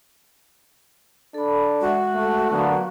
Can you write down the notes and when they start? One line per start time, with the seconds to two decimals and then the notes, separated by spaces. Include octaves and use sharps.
1.34 D4 A4 B5
1.81 G#3 F#4 E5
2.15 A3
2.52 D3 F#3 A#3 B3